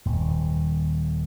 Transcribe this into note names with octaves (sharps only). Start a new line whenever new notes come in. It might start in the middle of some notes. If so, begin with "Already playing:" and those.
D#1 D#2